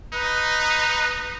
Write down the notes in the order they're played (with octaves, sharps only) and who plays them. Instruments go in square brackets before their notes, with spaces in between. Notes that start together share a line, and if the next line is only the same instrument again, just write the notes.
[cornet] D#4 [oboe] B4